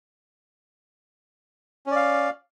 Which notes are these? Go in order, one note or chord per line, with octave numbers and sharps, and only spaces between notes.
C#4 D5 F5